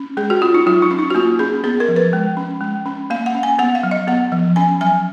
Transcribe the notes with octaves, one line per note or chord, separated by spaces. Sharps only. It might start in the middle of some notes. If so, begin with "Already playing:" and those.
Already playing: C#4
G#3 G#4
F#4
C#4 F4
D#4
F#3 F4
D#4
C#4
D#4
F#4
A#3 F4
C#4 G#4
B3 G#4
A#4
F3
B4
G#3
C#4
G#3
C#4
A#3 F5
F#5
C#4
G#5
B3 F#5
F5
F#3
D#5
B3 F#5
F3
C#4 G#5
F#3 G#5